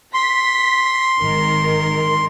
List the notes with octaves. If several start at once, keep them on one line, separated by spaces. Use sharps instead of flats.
C6 B6
G#1 D#3 A#4